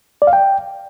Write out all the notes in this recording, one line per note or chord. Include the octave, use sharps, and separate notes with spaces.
D5
F5
G5